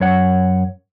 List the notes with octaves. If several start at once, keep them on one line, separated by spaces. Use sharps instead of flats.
F#2 C#5 F#5